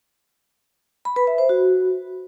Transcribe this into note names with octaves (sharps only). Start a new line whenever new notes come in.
B5
B4
E5
C5
F#4